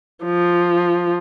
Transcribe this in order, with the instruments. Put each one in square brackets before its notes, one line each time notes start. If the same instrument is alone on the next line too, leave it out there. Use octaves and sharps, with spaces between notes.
[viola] F3